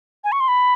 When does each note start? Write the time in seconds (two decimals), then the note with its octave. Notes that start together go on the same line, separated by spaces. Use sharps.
0.24 G#5
0.32 C#6
0.40 C6
0.48 B5